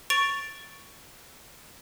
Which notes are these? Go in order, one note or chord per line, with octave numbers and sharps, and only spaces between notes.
C#6 A6 D7 F7